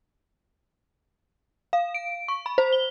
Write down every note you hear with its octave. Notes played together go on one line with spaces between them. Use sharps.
F5
D7
C#6
B5
C5
G7